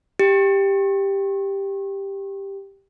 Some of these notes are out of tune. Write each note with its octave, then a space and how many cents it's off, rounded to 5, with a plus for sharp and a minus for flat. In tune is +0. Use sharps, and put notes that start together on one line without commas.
G4 +5